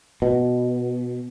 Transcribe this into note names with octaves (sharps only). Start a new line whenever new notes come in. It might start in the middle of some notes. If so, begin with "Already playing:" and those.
B2